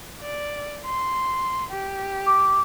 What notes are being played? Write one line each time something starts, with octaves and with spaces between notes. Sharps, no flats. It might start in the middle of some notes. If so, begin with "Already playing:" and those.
D5
C6
G4
D6